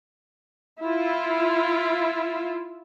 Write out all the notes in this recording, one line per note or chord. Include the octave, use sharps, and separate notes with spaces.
E4 F4